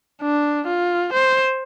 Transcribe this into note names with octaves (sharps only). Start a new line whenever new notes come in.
D4
F4
C5